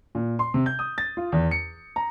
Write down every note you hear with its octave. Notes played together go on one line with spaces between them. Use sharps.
A#2
C6
C3
G6
D#6
A6
F4
E2
C#7
A#5